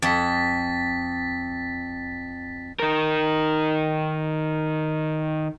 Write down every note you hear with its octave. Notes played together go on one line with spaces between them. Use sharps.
F2 A6 B6
D#3 A#4